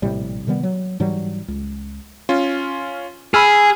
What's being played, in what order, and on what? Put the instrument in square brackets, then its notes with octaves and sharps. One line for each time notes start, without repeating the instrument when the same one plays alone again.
[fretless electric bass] A#1 A2 C3 G3
C3 D#3 G3 B3
F#3
G#2 E3 F#3 G3
C#2
[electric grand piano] C#4 F4
[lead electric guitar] G#4 [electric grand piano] B5 E6 F6